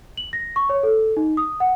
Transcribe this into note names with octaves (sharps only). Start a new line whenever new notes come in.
F#7
A#6
C#6
C#5
A4
D#4
D#6
F#5